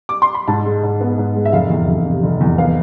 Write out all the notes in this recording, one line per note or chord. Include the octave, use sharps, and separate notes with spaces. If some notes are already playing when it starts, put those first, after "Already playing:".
D6
C6
B5
G#2 A5
G#3
G#2
B3
G#2
G#3
E5
F1 F5
E2
F1
C3
F1
E2
B3 F5